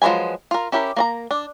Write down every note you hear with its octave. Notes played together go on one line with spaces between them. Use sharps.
F3 F#3 G#3 B4 G#5
F4 A#4
C#4 E4 G4 A#4
A#3 D5 A#5
D4